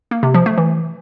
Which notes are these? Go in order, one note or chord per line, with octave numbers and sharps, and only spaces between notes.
A#3
C3
F3
A3
E3